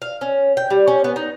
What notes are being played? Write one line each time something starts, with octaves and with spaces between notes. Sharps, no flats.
F5
C#4
G5
G3
C#4
B3
D#4